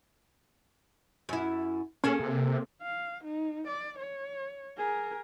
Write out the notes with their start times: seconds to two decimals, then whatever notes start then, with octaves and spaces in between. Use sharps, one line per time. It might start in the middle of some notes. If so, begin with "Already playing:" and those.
1.29 F#2 E4
2.04 A#3 C#4 G#4 A4
2.19 C3
2.82 F5
3.24 D#4
3.68 D5
3.99 C#5
4.77 G#4 A#4